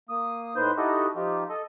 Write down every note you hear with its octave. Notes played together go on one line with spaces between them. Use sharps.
A#3 D#6
A2 D#4 B4 C5 G6
D#4 E4 F#4 G4 A4 D#5
F3 D#4 F4 G4
A4 D#5